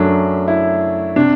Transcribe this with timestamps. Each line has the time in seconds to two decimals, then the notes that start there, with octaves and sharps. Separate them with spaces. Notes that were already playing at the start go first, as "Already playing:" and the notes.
Already playing: F#2 F#3 A3 D4
0.48 E4
1.16 C3 D4